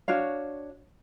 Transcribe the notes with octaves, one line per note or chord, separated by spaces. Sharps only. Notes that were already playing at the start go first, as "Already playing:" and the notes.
D4 F#4 C#5 F5